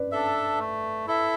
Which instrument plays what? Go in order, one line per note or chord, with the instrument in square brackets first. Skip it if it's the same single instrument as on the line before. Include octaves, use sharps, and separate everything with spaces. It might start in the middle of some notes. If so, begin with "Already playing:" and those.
Already playing: [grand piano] B4 D5
[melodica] D4 A4 E5
A3
E4 A4 E5